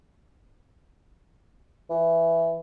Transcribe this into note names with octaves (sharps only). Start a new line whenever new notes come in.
E3